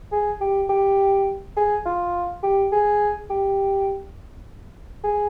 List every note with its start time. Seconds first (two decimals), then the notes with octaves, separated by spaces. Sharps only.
0.12 G#4
0.41 G4
0.70 G4
1.57 G#4
1.86 F4
2.43 G4
2.72 G#4
3.30 G4
5.04 G#4